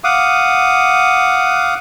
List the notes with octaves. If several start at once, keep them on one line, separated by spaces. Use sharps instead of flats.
F5 F#5 D6 D#6